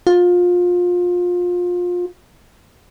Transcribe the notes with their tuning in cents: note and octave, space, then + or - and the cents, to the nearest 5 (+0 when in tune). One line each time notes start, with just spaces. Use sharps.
F4 +25